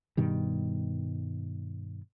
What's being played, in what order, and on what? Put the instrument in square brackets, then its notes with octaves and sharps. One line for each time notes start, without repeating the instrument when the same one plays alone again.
[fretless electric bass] G2 B2 D#3 G3